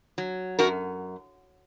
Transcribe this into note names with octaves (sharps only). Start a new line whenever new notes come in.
F#3
F#2 F#4 A#4